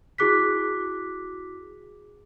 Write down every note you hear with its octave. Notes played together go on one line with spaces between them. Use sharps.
E4 F#4 G#4 D6 F#6 B6